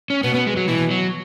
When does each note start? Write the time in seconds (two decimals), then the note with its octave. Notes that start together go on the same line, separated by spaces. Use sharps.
0.10 C#4
0.24 B2 B3
0.35 B3
0.47 G#3
0.57 F#3
0.68 B2 E3
0.91 F#3